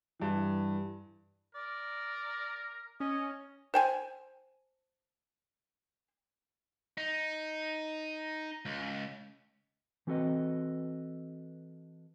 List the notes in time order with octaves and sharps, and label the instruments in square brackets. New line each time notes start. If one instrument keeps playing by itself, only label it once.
[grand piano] G2 E3
[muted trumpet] A#4 [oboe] D5
[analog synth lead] C#4 [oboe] D#5
[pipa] C5 G5 G#5
[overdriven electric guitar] D#4
C#2
[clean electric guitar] E3 C4 F#4 A4 B4 D#5